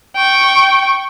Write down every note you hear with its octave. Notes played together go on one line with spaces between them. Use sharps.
G5 C#6